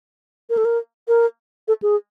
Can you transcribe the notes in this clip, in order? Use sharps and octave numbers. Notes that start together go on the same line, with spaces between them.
A#4
A4
A#4
A#4
A4
G#4